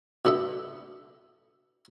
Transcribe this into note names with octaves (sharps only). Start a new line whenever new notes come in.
B2 B3 D4 A4 E5